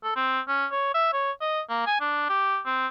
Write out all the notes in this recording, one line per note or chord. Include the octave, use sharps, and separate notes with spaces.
A4
C4
C#4
C#5
E5
C#5
D#5
A#3
G#5
D4
G4
C4